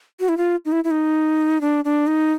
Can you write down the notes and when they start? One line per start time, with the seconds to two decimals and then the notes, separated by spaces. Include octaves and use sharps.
0.20 F#4
0.29 E4
0.37 F4
0.65 D#4
0.72 E4
0.84 E4
0.91 D#4
1.61 D4
1.85 D4
2.07 D#4